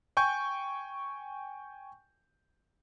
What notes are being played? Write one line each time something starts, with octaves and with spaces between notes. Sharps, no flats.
G5 G#5 C#6 G6